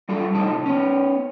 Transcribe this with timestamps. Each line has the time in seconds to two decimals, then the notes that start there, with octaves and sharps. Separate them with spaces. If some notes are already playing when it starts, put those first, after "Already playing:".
0.09 G3 F4 A4
0.34 A2 C3 F3 D#4 A5
0.66 B3 C#4